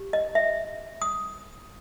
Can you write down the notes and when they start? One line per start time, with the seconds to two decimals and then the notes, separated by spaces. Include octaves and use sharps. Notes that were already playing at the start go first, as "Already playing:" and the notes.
Already playing: G4
0.13 D#5
0.35 E5
1.02 D#6